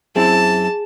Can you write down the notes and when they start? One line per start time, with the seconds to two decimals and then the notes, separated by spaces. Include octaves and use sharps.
0.16 F#2 C4 E4 G#4 A5